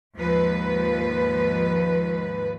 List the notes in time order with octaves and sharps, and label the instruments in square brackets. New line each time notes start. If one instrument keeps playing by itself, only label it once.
[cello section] D#2 G#2 F3 B4